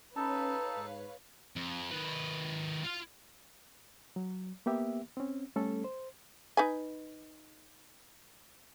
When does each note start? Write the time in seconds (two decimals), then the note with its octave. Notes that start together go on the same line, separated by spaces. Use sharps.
0.16 C#4 D#4 A4 B4 C#5 F5 A5 B5
0.76 G#2
1.56 F2
1.92 D#3 B4
2.84 F4 F5
4.16 F#3
4.66 A#3 B3 G4 E5
5.17 C4 C#4
5.56 G3 A3 C#4 A4
5.84 C5
6.57 D#4 B4 G#5